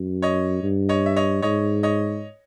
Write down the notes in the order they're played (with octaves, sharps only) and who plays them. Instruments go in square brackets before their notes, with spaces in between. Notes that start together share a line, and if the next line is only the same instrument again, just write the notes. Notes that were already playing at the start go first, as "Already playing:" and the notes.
Already playing: [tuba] F#2
[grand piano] C#5 D#5
[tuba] G2
[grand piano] C#5 D#5
E5
C#5 D#5
[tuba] G#2 [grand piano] C#5 D#5
[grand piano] C#5 D#5